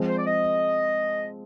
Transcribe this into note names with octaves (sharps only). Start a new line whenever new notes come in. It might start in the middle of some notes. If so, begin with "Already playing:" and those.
Already playing: F3 G#3 C4
C5
D5
D#5